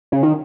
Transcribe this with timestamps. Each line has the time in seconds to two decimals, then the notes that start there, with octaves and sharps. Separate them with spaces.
0.12 C#3
0.23 D#3